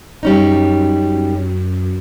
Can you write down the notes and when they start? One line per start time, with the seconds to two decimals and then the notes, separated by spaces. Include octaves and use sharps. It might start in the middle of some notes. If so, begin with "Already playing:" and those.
0.23 F#2 G3 C#4 D#4